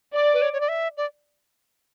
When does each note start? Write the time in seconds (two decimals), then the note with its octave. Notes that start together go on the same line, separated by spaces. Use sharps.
0.14 D5
0.34 B4
0.42 C#5
0.53 C#5
0.61 D5
0.69 E5
0.97 D5